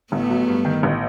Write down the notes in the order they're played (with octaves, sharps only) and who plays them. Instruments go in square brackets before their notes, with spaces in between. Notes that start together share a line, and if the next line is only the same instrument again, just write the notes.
[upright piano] A1 [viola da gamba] A3 B3
[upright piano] F#3
G2
D#3
A1